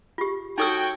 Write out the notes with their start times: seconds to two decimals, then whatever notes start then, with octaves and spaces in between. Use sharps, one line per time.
0.18 F4 G4
0.58 D#4 F#4 A4 C#5 G5 E6